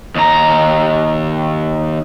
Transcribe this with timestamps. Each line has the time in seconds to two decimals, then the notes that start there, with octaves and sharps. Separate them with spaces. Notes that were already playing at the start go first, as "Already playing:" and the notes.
0.16 D#2 A#5